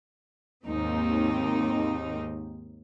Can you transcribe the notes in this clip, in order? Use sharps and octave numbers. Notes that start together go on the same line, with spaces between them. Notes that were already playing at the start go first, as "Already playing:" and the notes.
D#2 G#2 C4 D#4